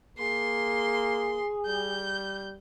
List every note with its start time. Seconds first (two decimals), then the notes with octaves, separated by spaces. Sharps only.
0.18 A#3 G#4 C6
1.66 G3 G6